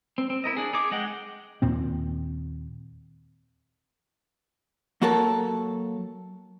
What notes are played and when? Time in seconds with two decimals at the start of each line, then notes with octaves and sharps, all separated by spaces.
0.18 C4
0.30 C4
0.44 E4 A#4 D#5
0.57 D4 G#4
0.73 D#4 G#4 D6
0.91 G#3 D#5 F#5 G5
1.62 D#2 A#2 C4
5.02 F#3 A#3 F#4 A4 A#4 A5